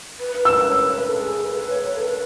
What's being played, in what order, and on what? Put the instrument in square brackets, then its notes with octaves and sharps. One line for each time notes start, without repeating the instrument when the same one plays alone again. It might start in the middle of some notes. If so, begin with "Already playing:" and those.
[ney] B4
B4
[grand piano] E6
[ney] B4
C#5
B4
B4
A4
G#4
B4
C#5
B4
A4
B4